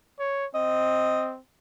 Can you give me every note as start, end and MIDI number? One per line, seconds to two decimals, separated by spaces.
0.19 0.46 73
0.54 1.39 60
0.54 1.31 75